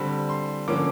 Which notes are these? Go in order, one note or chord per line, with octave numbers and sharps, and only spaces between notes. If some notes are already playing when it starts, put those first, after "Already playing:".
Already playing: D3 G3 C4 B5
C6
D3 F3 A#3 C#4 D6